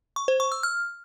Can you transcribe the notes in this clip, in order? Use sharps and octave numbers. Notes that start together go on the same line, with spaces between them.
C#6
C5
C#6
E6
F6